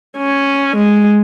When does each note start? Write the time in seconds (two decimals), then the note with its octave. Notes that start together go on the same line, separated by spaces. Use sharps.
0.18 C#4
0.77 G#3